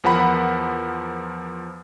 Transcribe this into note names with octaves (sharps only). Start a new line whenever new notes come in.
E2 F3 A#4 F#5 B5